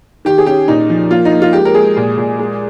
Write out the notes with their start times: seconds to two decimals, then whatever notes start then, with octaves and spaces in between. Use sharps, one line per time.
0.25 D#3 G4
0.38 G#4
0.47 C#4 G4
0.68 A#2 D#4
0.90 F3
1.11 A#3 F4
1.25 D#4
1.32 A#3
1.42 F4
1.53 G#3 G4
1.65 A#4
1.74 G#3 G#4
1.97 A#2
2.18 A#2
2.39 G#3